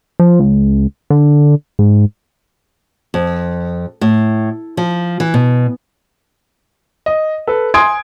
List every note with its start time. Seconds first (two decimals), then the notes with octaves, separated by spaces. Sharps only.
0.20 F3
0.40 C#2
1.10 D3
1.79 G#2
3.14 F2
4.01 A2
4.77 F3
5.20 E3
5.34 B2
7.06 D#5
7.47 A4 B4
7.74 G#5 C6 D#6 G#6 D7